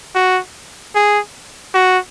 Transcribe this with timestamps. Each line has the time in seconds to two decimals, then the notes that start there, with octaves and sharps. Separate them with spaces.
0.15 F#4
0.95 G#4
1.74 F#4